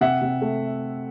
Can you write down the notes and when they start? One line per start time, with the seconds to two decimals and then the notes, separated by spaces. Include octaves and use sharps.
0.01 C3 E5 F#5
0.22 C3
0.42 A3